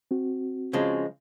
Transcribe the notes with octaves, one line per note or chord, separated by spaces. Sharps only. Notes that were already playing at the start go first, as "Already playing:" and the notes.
C4 F#4
C#3 F3 G#3